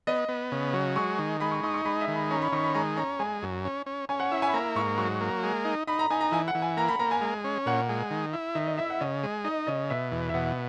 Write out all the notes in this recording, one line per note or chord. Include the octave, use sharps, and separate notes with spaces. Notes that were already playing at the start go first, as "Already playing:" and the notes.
B3 D#5
B3
C#3
F#3
G#3 C#6
D#3
G#3 B5
C#6
D#4 C#6
C#6
G#3 B5
E5
D#3
B5
C#4 A#5
B5
D#3 C#6
B5
G#3 A#5
C#4 A#5
G#3 G#5
F#2
C#4
C#4
C#4 G#5
F#5
E4 E5
G#5
B5
A#3 A#5
G#2 C#6
F#3 C#6
A#3
G#3
D#4
D#4 B5
A#5
D#4 G#5
A#5
E3 G#5
F#5
E3
G#5
A#3 A#5
B5
A#3 A#5
G#5
G#3
C#4
A#2 F#5
G#3
D#3
E4
D#3 E5
D#5
E4 E5
F#5
C#3 D#5
G#3
D#4 D#5
C#3 D#5
B2 E5
E2
E5
B2 F#5